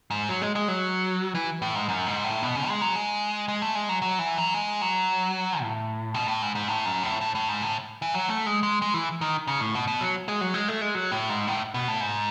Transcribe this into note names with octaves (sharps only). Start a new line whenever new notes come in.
G#2
F#3
G#3
G#3
F#3
E3
A2
G#2
F#2
G#2
A2
B2
C#3
G#3
F#3
G#3
G#3
A3
G#3
F#3
F#3
E3
F#3
G#3
F#3
A2
B2
A2
G#2
G#2
A2
F#2
A2
A2
A2
G#2
A2
E3
F#3
A3
G#3
G#3
G#3
E3
D#3
C#3
A2
B2
B2
F#3
G#3
F#3
G#3
A3
G#3
F#3
A2
G#2
A2
B2
A2
G#2